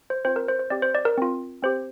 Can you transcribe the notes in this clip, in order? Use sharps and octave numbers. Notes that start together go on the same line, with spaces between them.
C5
C4 F4 C5
A#4
C5
C5
C4 G4 D5
C5
D5
A#4
C4 F4
C4 G4 C5